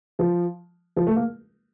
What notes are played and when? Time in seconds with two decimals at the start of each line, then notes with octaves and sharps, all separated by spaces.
0.19 F3
0.96 F3
1.07 A3
1.16 A#3